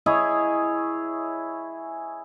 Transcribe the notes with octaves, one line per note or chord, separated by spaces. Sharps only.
E4 G#4 C#5 D#5